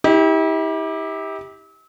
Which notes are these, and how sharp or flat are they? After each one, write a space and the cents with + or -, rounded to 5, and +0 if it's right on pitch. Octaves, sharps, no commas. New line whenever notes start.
E4 -40 G4 +15